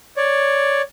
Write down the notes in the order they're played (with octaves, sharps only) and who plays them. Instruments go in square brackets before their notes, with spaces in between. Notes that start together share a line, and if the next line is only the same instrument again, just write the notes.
[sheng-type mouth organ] C#5 D5